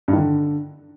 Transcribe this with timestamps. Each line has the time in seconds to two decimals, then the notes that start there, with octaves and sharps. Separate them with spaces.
0.08 G2
0.13 D#3
0.18 D3